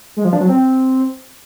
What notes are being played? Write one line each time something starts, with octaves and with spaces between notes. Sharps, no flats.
G#3
F3
D4
F#3
C4